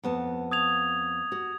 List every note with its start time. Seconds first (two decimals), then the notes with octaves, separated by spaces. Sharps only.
0.03 F2 B3 A5
0.51 D#6 G#6 F7
1.32 F#4